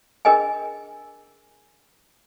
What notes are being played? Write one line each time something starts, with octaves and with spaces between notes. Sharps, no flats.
D4 G#4 A#4 D#5 G5 G#5